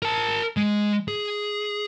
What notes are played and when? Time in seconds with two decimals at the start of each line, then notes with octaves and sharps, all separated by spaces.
0.02 A#4 A5
0.57 G#3
1.08 G#4